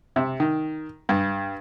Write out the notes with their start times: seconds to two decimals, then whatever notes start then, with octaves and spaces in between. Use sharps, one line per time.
0.16 C3
0.40 D#3
1.09 G2